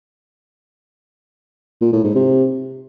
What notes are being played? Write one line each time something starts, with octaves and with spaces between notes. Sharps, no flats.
A#2
A2
G#2
C3